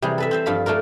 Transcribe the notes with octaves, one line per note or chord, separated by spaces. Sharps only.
C3 E3 G3 G#4
A4 B4 E5
C4 C5 E5
G2 F3 F4 B5
A3 D4 F4 A#4